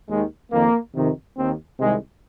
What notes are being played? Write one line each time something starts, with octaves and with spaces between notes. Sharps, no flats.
D#2 D#3 G#3
F2 D#3 A#3
F2 C3 D#3
D#2 D#3 C4
C2 C3 D#3 G#3